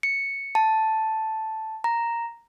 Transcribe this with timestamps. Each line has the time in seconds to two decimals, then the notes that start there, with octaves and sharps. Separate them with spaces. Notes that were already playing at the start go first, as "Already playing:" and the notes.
0.03 C#7
0.55 A5
1.84 A#5